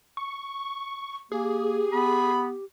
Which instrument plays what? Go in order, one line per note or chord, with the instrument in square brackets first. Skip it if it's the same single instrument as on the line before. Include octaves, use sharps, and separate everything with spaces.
[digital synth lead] C#6
[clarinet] A#3 [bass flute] G4 [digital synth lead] G#4
[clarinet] B3 [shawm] B5